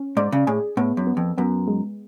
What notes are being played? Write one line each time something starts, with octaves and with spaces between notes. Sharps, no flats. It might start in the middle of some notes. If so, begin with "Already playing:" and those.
Already playing: C#4
G#2 D5
C#3
A2 G#4
A2 B3
F#2
B3
F2
F#2 B3
G#3